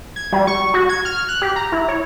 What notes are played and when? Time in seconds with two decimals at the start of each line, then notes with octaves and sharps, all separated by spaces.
0.16 G#6
0.33 G3
0.47 C#6
0.74 F#4
0.89 G#6
1.05 F6
1.17 F6
1.29 F#6
1.42 G4
1.56 A#5
1.72 E4
1.88 C#5